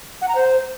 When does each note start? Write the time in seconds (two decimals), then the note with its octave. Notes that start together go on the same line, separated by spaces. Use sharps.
0.22 F#5
0.28 A#5
0.35 C5